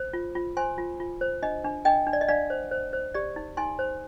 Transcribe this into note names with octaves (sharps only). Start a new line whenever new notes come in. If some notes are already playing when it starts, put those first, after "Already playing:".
Already playing: C5
F4
F4
C5 G#5 C6
F4
F4
C5
D4 D#5
D4
D4 D#5 G5
D4
D5
D#5
D4 D5 F5
C5
C5
C5
G4 D5
D#4
D#4 G#5 C6
C5